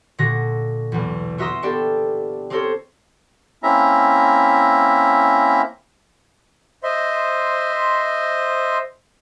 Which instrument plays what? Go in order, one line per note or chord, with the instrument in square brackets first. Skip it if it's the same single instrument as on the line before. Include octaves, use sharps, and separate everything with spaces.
[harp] A#2 D3 F#4 A#6
B1 E2
F4 F#4 E5 A#5 C6 D#6
B3 D4 G4 A4 D5
C4 G4 A4 A#4 C5 C#5
[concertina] A#3 C4 C#4 E4 E5 A#5
[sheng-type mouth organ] C5 D#5 E5 C6